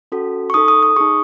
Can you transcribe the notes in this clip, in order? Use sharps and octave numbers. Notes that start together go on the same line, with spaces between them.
C#4 F#4 A4
C#6
D#4 A4 D#6
D#6
D#6
D#4 G#4 C#6